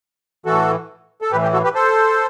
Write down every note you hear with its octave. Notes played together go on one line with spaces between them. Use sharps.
A2 E3 F#4 A4
A4
A2 E3 G4 B4
G4
F#4 A4
G4 B4
A4 C5